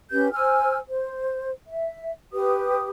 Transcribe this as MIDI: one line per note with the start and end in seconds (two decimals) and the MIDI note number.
0.11 0.32 61
0.11 0.32 67
0.11 0.32 71
0.11 0.32 91
0.32 0.77 72
0.32 0.77 80
0.32 0.77 88
0.32 0.77 89
0.88 1.51 72
1.66 2.10 76
2.32 2.90 67
2.32 2.90 71
2.32 2.90 87